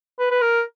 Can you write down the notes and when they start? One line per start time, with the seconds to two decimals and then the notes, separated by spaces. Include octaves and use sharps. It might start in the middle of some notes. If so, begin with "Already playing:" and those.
0.19 B4
0.31 B4
0.42 A#4